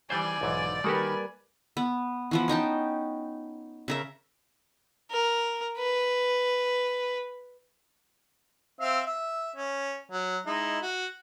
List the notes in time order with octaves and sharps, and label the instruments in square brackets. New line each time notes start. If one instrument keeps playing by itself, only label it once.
[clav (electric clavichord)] E3 G3 C5 [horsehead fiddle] D5 [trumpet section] G#5 [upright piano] G6 G#6
[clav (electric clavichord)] B1 G#2 E3
[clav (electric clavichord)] D#3 F#4 G4 [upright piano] G3 A#3 B4 [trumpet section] G#5
[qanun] B3
E3 F3 B3
C#4 D#4 G5 A5
C#3 A#4 E5
[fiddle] A#4
B4
[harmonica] C4 E5 F5
E5
C#4
F#3
G#3 D#4 E4
F#4